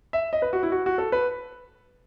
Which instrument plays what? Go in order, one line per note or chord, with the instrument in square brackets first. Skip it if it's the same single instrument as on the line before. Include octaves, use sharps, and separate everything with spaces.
[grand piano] E5
D#5
B4
F#4
E4
F#4
F#4
A4
B4